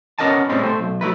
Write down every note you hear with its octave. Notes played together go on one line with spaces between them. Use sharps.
B3 C#4 A#4 D#5 G#5 A5
A2 G3 G#3 C4 C#4
A3 C5
B1
F#3 A3 E4 B4